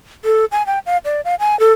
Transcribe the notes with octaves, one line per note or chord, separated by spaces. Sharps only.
A4
G#5
G5
F5
D5
F5
G#5
A4